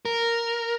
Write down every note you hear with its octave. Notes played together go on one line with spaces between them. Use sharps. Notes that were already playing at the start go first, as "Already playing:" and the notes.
A#4